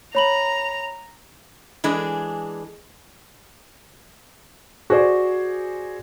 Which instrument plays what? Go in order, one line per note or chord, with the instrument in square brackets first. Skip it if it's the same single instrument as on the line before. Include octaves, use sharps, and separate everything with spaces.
[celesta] C#5 B5 F#7 [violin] A#5 F7
[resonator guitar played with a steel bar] E3 G#3 D4 G#4
[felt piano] F#4 G#4 C5 D5